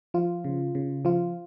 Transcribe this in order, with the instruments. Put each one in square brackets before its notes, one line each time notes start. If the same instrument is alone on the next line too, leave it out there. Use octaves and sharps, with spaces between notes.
[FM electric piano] F3 F4
C#3
C#3
F3 F4